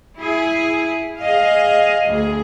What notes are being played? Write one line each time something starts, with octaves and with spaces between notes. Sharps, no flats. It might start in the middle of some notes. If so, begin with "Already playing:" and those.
E4 G#4
G#4 D#5 F5
D2 G#4